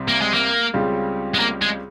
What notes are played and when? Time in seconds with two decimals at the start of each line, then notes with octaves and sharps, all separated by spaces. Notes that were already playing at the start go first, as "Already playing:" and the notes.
Already playing: C2 C3 G3 C4
0.08 A#3
0.21 G#3
0.34 A#3
0.73 C#2 C#3 G3 C4 F4
1.34 G#3
1.40 A#3
1.62 G#3